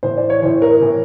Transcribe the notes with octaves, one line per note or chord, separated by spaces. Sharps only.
A2 E3 C5
D5
C#5
A2 E3 C5
A#4
A2 E3